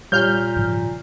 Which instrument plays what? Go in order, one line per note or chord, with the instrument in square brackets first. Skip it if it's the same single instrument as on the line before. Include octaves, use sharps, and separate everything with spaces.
[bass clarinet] A#2 [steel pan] G3 C#5 F5 [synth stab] F6 G6
[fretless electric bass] G#2 C#3 F3